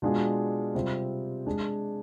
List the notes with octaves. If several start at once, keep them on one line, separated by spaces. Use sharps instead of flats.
B2 G#3 D4 F4 G#4
C3 G3 C4 F4
G#3 D4 G#4